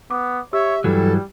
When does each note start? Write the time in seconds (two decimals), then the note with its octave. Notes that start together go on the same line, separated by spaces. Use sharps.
0.11 B3 D6
0.53 G4 C#5 E5 E6
0.84 G2 E3 F#3 G3 A4